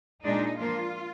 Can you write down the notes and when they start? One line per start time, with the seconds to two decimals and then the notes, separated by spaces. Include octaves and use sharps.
0.23 A#2 G#3 D4 D#4
0.58 F3 A#3 D4 F4